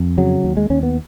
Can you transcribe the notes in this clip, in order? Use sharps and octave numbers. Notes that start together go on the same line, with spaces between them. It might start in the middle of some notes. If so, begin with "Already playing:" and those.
Already playing: F2
C#3 F#3
D#2
G#3
D#2 C#4
B3